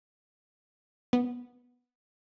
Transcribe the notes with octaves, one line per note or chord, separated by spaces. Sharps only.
B3